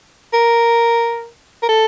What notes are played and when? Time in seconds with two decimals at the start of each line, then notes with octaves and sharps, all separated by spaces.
0.34 A#4
1.63 A#4
1.69 A4